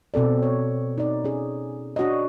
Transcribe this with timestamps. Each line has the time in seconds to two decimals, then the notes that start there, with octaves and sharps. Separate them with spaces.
0.14 B2 C4 A4 D5
0.43 C#5
0.98 D#4 D5
1.24 C#4 G#4
1.96 D4 F#4 C#5 D#5